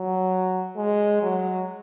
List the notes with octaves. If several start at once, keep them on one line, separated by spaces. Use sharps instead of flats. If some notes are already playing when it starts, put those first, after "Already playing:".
Already playing: F#3
G#3
F#3